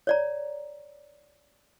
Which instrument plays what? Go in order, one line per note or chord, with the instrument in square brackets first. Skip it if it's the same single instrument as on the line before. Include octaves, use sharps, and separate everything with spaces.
[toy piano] C#5 D5 A#5